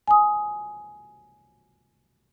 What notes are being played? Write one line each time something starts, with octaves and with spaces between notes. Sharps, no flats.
G#5 D#6